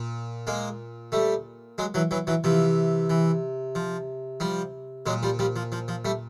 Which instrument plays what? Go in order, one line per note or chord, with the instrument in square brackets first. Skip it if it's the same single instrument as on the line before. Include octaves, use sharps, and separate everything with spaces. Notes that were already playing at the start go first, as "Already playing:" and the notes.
Already playing: [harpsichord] A#2
G#3 A#3
G3 A3
F#3 G#3
E3 F#3
E3 F#3
E3 F#3
C3 E3 F3
E3
F3
F3 G3
A#2 F#3 G#3
F3 G3
F3 G3
F3
F3
F3
G3 A3